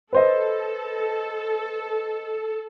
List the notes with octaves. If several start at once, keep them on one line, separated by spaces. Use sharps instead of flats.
A4 B4 C5 D#5